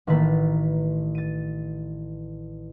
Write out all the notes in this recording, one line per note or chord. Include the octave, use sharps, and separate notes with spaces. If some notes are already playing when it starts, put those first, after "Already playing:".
A1 D#3 A3 A#3 B4 A6
A6 D#7